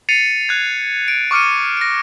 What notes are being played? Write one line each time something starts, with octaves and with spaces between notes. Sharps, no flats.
A6 C7 C#7 D#7 F7
F#6 G#6
D7
C#6 D6 F6 C#7 D#7
A#6 D7